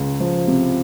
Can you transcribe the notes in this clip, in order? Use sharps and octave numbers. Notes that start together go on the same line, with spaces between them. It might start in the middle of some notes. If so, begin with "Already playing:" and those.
Already playing: C#2
F3
C3